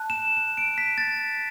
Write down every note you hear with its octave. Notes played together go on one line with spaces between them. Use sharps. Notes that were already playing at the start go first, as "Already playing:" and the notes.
Already playing: A5 F#6
E7
E7
D7
B6
A6